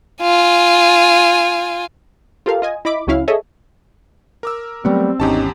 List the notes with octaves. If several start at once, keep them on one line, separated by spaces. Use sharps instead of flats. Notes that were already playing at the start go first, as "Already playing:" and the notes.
F4 G#5
F4 G4 A4 A#4 F5
F4 D#5 G#5
E4 D#5 B5 D6
C#2 F#3 C#4 E4 F5
G#4 A4 C#5 D#5 E5
A#4 D6 E6
F#3 G3 A3 B3 C4
G#1 E2 C#4 D#4 G4 A5